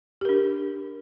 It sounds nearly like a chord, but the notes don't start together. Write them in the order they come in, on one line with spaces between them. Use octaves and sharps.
G4 A#4 D4